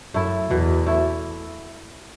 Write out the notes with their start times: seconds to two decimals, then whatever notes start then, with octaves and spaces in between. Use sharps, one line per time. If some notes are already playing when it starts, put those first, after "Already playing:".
0.14 F#2 A3 E4
0.51 E2 B2
0.86 A3 E4